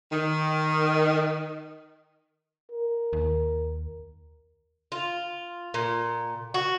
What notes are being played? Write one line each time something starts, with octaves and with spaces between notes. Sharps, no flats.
D#3
A#4
D#2
F4
A#2
F#4